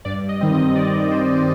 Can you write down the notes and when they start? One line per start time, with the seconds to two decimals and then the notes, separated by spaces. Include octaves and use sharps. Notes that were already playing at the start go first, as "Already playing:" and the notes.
0.05 G2 D5
0.29 D#5
0.41 D#3 G3 C4
0.53 D#5
0.76 G2 D5
1.11 D#3 G3 C4 C5